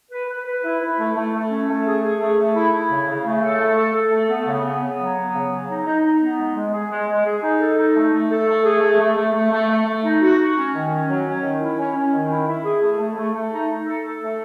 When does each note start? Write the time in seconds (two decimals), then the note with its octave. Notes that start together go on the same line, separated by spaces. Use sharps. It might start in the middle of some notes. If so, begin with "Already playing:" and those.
0.11 B4
0.29 B4
0.46 B4
0.64 E4
0.81 E4
0.99 A3
1.16 A3
1.33 A3
1.50 C#4
1.68 A3
1.86 G#4
2.03 G#4
2.20 A3
2.38 A3
2.55 E4
2.73 E4
2.90 C#3
3.07 C#3
3.25 A3
3.42 A4
3.60 A3
3.77 A4
3.94 A4
4.12 A3
4.29 B3
4.47 C#3
4.64 B3
4.82 B3
4.99 F#3
5.16 B3
5.34 C#3
5.51 F#3
5.68 D#4
5.86 D#4
6.03 D#4
6.21 B3
6.38 G#3
6.55 G#3
6.73 G#4
6.90 G#3
7.08 G#3
7.25 G#4
7.42 D#4
7.60 A4
7.77 D#4
7.95 A3
8.12 A3
8.30 A4
8.47 A3
8.64 G#4
8.82 A3
8.99 A3
9.17 A3
9.34 A3
9.52 A3
9.69 A3
9.86 A3
10.04 D#4
10.21 F#4
10.38 F#4
10.56 C#4
10.73 D#3
10.91 C#4
11.08 F#3
11.26 C#4
11.43 D#3
11.60 E4
11.78 C#4
11.95 C#4
12.13 D#3
12.30 E4
12.47 E4
12.64 G#4
12.82 A3
12.99 A3
13.17 A3
13.34 A3
13.51 D#4
13.69 D#4
13.86 A4
14.04 A4
14.21 A3